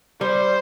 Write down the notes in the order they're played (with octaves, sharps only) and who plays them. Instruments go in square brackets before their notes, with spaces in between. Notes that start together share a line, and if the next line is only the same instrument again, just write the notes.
[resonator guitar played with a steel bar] G3 [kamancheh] C5